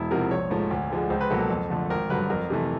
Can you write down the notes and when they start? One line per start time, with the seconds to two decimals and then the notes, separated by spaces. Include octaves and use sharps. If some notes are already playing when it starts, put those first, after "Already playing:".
Already playing: E1 E4
0.11 E2 C3 F3 A#4
0.31 A#1 C#5
0.50 G#2 F3 A3
0.71 D2
0.90 D3 F3 G#3
1.10 C#2 C5
1.21 B4
1.30 B2 F#3 A#3 A4
1.41 A4
1.50 F2
1.70 D3 F3 A3
1.90 G#1 A#4
2.10 G2 D3 F#3 B4
2.30 F2 A#4
2.50 C3 E3 A3